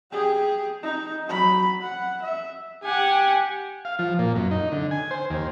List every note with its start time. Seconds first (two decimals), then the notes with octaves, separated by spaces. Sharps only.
0.12 G4 G#4
0.83 D#4
1.27 F#3 B5
1.82 F#5
2.22 E5
2.84 G4 F#5 G#5
3.85 F5
3.99 F3
4.19 A#2
4.36 F#2
4.51 D#4
4.72 D3
4.91 G#5
5.11 C5
5.30 D#2